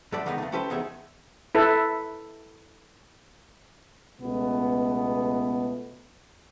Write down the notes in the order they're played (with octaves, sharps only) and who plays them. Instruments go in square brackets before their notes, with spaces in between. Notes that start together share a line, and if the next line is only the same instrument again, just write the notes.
[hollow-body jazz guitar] F#2 A3 A4 D5 B5
D3 D#3 G#3 B3 C#4 D#4
F2 A3
A3 C#4 G4 A4 B4 C5
E2 D#4 G#4 E5
[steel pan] E4 A4 B4
[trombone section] C#2 B2 A3 B3